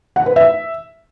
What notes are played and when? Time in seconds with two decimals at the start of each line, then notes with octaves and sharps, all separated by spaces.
0.16 F#5
0.26 B4
0.36 E5